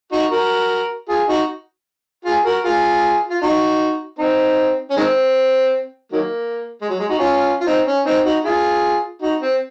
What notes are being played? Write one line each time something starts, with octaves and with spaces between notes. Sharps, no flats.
D#4 F#4
F#4 A#4
F4 G#4
D#4 F#4
F4 G#4
F#4 A#4
F4 G#4
F4
D#4 F#4
C4 D#4
C#4
D#3 G#3 C4
D#3 F#3 A#3
G#3
F#3
G#3
D#4 F#4
C#4 F4
F4
C4 D#4
C#4
C4 D#4
D#4 F#4
F4 G#4
D#4 F#4
C4